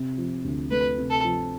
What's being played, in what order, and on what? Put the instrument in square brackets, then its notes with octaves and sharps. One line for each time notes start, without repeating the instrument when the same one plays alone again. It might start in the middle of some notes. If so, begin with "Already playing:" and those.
Already playing: [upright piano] C3
F3
D2
[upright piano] A3 [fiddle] B4
[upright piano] C3
[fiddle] A4
[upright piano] F3